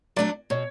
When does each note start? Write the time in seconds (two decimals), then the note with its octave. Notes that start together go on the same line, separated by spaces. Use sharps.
0.16 F#3 A3 D4 D5
0.50 B2 C#5